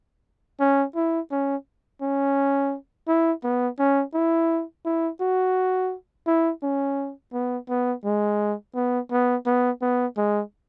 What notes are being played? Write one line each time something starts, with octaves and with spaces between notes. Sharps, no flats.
C#4
E4
C#4
C#4
E4
B3
C#4
E4
E4
F#4
E4
C#4
B3
B3
G#3
B3
B3
B3
B3
G#3